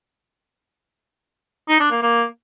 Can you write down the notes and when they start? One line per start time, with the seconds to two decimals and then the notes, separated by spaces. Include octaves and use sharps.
1.69 D#4
1.80 D4
1.92 A#3
2.03 A#3